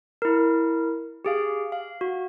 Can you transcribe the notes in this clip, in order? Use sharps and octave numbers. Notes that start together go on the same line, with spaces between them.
E4 A#4
G4 G#4 F5
F5
F#4